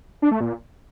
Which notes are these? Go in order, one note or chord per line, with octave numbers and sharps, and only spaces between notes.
D4
A3
A#2